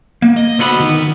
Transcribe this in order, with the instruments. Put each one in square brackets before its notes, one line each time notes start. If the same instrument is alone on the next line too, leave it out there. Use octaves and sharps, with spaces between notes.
[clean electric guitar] A#3
[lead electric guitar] D#5
[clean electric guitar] D3 B3 B5 [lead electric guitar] F#4 C5
[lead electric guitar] D#3